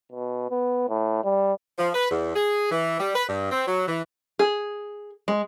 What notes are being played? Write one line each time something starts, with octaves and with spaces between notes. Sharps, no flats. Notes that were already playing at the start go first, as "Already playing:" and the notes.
B2
B3
A2
G3
F3
B4
E2
G#4
E3
G3
B4
G2
C4
F#3
E3
G#4
G#3